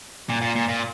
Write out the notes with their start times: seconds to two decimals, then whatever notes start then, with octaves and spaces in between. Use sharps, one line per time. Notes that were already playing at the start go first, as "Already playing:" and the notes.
0.29 A#2
0.42 A#2
0.56 A#2
0.69 A#2